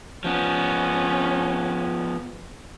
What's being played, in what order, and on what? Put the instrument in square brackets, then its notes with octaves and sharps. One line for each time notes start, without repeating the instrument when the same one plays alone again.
[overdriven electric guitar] F3 B3 [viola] C#4